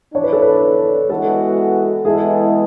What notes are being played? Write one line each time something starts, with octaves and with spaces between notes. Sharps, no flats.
E3 B3 D4 C#5
B4
A4
B4
E3 G#3 B3 F#4 A4
E3 G#3 B3 E4 G#4 A4